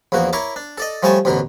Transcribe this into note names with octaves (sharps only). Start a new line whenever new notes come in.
A#1 E2 A#3 F#4
E4 A#4 C#5 D6
D4
A4 D5 D#5
F3 G3 A3 C#5 G#5 A5
A1 D2 B2 A#4